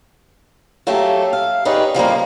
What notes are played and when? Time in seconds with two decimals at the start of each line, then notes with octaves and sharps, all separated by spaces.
0.87 F#3 A3 A#3 C#4 G4 A4
1.33 F5
1.65 D#4 G4 G#4 B4 C#5 D5
1.94 C#3 F3 G3 A#3